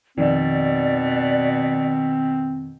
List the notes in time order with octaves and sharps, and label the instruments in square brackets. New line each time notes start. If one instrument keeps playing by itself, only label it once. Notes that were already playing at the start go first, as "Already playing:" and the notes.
[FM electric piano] F2 D#3 [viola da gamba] B2 [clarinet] C4 [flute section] D5